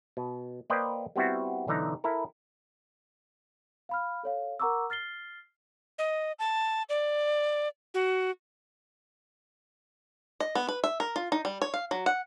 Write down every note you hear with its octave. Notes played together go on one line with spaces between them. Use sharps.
B2
A#3 B4 C5 D5 D#5 G5
G3 B3 C4 E4 F#4
B1 D3 E3 D#4 A#5
E4 A4 A#4
F5 B5 F6
A4 C#5 F5
A#4 F#5 A#5 C#6 D6 E6
F6 A6 C7 G7
D#5
A5
D5
F#4
D#5
B3
B4
E5
A#4
F4
D#4
G3
C#5
F5
F#3
F#5